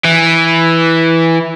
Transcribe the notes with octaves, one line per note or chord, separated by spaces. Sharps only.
E3